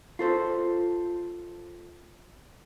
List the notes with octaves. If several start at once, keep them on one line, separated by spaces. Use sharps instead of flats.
F4 A4 C5